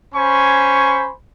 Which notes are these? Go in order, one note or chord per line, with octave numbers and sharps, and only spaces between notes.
C#4 C5 G#5 B5 C#6